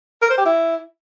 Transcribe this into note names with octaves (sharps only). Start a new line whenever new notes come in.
A#4
C5
G4
E4